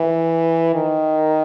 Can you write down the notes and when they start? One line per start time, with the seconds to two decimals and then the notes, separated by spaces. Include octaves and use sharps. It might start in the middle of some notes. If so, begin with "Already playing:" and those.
Already playing: E3
0.74 D#3